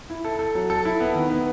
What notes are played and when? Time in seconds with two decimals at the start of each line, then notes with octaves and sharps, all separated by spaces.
0.10 E4
0.25 A4
0.39 A4
0.55 F#3
0.70 A4
0.85 E4
1.00 B3
1.15 D#3
1.30 B3